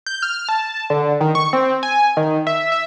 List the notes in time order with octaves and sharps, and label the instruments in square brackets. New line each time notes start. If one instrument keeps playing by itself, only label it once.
[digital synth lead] G6
F6
A5
D3
D#3
C#6
C4
G#5
D#3
E5
E5